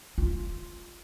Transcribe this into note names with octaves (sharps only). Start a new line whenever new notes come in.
F4